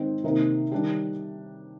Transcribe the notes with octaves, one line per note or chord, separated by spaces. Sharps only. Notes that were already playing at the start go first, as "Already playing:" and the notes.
Already playing: G#2 D#3 C4 D#4
C3 D#3 A#3 D#4
D#3 G3 D4 G4